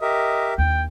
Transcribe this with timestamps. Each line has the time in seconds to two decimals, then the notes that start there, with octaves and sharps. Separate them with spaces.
0.01 G4 A#4 D#5 E5
0.58 D#2 D4 G5